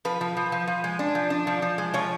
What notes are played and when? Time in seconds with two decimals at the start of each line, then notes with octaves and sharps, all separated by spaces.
0.05 F3 B4
0.21 F3
0.37 F3
0.52 F3
0.67 F3
0.84 G#3
0.99 D4
1.15 F3
1.30 D4
1.47 F3
1.62 F3
1.78 G#3
1.94 F3 C#5